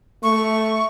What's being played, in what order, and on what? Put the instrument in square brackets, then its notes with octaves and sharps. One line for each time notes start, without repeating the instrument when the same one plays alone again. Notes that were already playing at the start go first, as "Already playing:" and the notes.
[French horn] A3 [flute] C#6